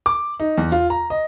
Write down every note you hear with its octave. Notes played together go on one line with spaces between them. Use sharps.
D6
D#4
E2
F4
A#5
D#5